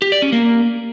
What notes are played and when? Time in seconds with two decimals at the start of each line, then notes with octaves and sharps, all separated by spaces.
0.02 G4
0.12 D5
0.22 C#4
0.32 A#3